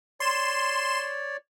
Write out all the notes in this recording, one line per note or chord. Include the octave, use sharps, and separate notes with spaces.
C#5 D5 C6 E7